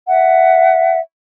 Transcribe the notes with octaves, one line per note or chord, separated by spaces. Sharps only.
E5 F#5